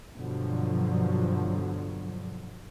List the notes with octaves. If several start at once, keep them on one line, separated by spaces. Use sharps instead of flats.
G2 B2 D3 F3 F#3